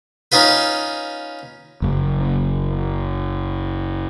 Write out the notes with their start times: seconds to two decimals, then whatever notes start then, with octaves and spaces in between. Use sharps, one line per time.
0.32 C#4 D#4 F4 B4
1.82 F#1 F#2